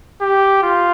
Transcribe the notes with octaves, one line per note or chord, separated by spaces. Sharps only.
G4
F4